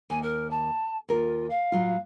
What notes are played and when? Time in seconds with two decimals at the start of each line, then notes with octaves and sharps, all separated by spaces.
0.10 D#2 G#5
0.22 A#4
0.50 A5
1.09 D#2 F4 A#4
1.49 F5
1.72 A2 F#3 F4